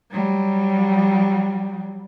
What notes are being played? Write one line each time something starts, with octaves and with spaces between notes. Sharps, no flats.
F#3 G3